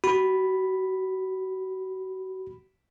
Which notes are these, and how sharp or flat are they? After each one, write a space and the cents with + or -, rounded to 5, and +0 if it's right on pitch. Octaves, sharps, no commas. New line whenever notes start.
F#4 +30 B5 +0